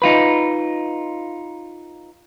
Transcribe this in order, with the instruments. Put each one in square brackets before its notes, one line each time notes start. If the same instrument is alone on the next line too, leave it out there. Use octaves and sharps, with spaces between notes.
[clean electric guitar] D#4 F4 B4